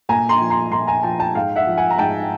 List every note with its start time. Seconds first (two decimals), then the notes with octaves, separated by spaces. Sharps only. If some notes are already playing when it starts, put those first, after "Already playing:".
0.09 A#2 G#5 A#5
0.29 A#5 C6
0.41 F3
0.50 A#5 C6
0.72 A#2 A#5 C6
0.87 G#5 A#5
1.03 F3 G5 A5
1.19 G5 A5
1.35 G#2 F5 G5
1.56 E5 F#5
1.67 F3
1.77 F#5 G#5
1.91 A#5
1.98 G#2 G5 A5